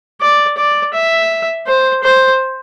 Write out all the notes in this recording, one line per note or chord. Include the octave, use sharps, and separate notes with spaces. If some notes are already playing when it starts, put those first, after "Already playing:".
D5
D5
E5
C5
C5